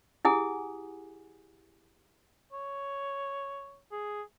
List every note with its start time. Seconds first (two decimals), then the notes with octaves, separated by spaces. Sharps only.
0.25 E4 G4 G#4 F#5 G#5 D#6
2.53 C#5
3.92 G#4